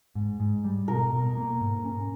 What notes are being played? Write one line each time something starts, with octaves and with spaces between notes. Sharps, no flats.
G#2
G#2
G3
B2 A#4
B2
A#3
G#2
C#4